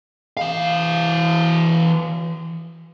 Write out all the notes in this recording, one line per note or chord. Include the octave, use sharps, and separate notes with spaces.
E3 F5